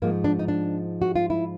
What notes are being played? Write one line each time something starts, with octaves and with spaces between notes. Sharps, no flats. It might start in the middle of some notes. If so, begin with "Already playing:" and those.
G#2 F3 G#3 A#3
D4
D#4
D4
F#4
F4
E4